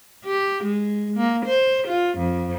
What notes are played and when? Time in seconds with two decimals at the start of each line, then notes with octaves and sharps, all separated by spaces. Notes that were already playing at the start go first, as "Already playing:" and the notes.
0.25 G4
0.64 G#3
1.17 A#3
1.45 C5
1.88 F4
2.18 F2